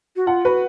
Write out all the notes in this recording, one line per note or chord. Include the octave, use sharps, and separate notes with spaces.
F#4
F4 F#5
F#4 B4